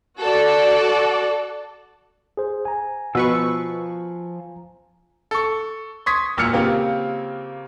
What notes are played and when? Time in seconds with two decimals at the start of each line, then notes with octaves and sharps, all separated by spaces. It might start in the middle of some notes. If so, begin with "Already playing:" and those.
0.22 F#4 A4 D5
2.37 G#4 C5
2.65 G#5 A#5
3.15 B2 F3 F4 B4 C#6 E6
5.31 A4 C#6
6.06 C6 C#6 D#6 G#6 B6
6.37 E1 A#2 E6 F6 C#7
6.53 C#3 A#3 C4 F4 G4